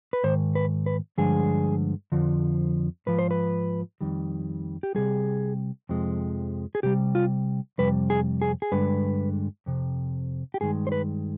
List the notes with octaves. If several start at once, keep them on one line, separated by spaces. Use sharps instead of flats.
B4
G#2 D#3 C5
B4
B4
G2 D3 F3 G#3 G#4
F2 D3 F3
G#2 F3 B4
C5
B4
F2 D#3 G3
G4
C3 G3 G#4
F2 C3 F3 G#3
G#4
C3 G3 G4
F4
F2 C3 G3 B4
G#4
G#4
G#4
G2 D3 G#3 B4
F2 C3
G4
G2 D#3 G#3 G#4
C5
B4